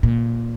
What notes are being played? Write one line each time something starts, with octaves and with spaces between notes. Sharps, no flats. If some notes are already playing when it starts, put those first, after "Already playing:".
A#2